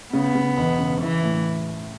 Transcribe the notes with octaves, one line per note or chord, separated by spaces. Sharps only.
C#3 B3
C#3
E1
C#3
E3 E4
A2